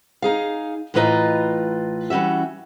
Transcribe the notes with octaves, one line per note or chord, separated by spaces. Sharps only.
D#4 G#4 F5
A2 E3 F4 B4 D#5 A#5
E3 G3 C#4 F#4 E5